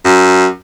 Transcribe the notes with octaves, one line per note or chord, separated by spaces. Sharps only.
F#2